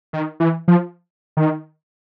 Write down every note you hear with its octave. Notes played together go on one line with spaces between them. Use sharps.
D#3
E3
F3
D#3